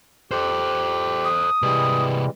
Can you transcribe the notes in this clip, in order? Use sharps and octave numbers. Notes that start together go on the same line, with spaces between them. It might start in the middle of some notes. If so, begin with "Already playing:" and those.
G4 A4 C5
D#6
C3 E3 G3 G#3 B4